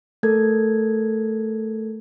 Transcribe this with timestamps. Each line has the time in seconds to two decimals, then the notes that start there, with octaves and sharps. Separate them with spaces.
0.23 A3 A4 A#4 G#6